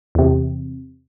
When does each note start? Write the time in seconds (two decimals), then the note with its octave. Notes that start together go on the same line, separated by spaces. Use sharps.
0.15 E2 C3